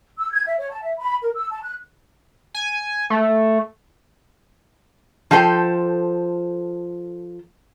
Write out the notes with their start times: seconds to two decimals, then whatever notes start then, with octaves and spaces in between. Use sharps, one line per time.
0.19 E6
0.31 G#6
0.46 E5
0.58 C#5
0.70 A5
0.82 E5
0.98 B5
1.22 A#4
1.35 E6
1.51 A5
1.62 F#6
2.54 G#5
3.10 A3
5.31 F3 F#4 A4 C5 G5